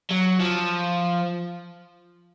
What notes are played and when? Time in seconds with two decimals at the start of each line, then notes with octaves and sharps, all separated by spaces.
0.11 F#3
0.40 F3